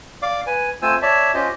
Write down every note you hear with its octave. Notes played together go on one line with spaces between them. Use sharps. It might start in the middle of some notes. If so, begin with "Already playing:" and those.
D5 F5 D6
B4 G#5
A3 C4 F4 C5 G#5 E6
C#5 D5 E5 A5
C#4 F4 G4 C5 D#5